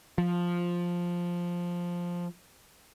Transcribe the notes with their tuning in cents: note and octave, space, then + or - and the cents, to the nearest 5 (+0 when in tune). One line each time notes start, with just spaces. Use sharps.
F3 +5